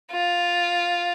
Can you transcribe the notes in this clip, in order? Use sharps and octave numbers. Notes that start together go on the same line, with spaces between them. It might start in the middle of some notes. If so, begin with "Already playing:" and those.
F4